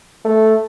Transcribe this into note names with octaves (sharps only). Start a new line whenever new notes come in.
A3